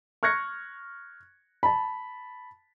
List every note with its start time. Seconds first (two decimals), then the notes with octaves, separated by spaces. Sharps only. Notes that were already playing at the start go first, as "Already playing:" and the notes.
0.23 C#6 F6 F#6 G#6 A#6 C#7
1.63 A5 B5